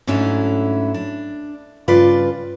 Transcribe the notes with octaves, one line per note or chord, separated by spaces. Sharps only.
G#2 F#3 A3 C#4 D4 E4
D4
G2 C#3 F4 B4 D5